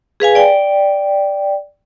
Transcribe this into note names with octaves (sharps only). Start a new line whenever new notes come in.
G#4 B4 F5 G#5
D5 G5